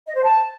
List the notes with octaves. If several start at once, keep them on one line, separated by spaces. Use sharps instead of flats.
D#5
C5
A5